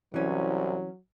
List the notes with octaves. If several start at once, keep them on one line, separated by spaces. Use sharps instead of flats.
C2 E3 F#3 C#4